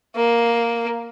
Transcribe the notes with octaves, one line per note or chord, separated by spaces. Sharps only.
A#3